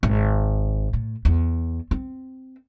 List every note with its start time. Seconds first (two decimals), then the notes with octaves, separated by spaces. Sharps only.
0.03 G#1
0.93 A2
1.25 E2
1.91 C4